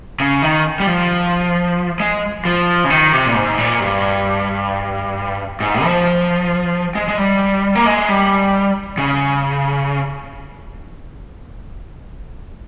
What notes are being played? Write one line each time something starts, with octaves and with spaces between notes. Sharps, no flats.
C#3
D#3
G3
F3
G#3
F3
C#3
D#3
C3
A#2
G#2
A#2
G2
G#2
F3
G#3
G#3
G3
A#3
G#3
G3
C#3